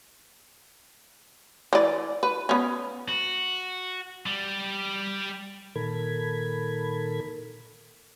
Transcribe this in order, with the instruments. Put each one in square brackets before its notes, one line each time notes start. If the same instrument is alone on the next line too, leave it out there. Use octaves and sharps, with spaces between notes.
[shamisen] E3 D5
B4
B3 C#4
[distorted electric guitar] F#4
G3
[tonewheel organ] A#2 D#3 A4 A#4 B5 G#6